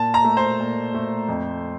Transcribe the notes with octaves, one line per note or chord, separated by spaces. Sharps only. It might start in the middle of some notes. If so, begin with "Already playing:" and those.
Already playing: A#2 A5
A#5
A3
C5
A#2
A3
F2